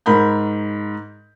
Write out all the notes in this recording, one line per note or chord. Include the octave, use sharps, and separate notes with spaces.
G#2 A#4 B5 G6